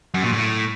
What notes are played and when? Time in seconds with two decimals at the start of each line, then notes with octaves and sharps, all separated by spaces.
0.14 F#2
0.23 A#2
0.32 A2